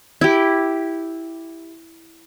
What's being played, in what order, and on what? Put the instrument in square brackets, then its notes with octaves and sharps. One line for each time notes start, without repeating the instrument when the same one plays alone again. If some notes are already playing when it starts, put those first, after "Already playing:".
[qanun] E4 G4